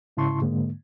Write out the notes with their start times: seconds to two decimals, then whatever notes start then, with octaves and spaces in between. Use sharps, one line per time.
0.17 G#2 C#3 E4 A5 C6 C#6
0.42 G#2 D3 G#3 A#3